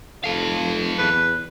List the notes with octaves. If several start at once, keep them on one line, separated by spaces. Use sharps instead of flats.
F1 A4 F5
E2 B4